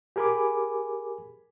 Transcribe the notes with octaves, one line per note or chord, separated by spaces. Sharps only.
G4 G#4 A#4 G#5 B5 D6